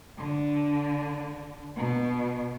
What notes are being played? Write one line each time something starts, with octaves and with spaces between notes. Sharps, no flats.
D3
B2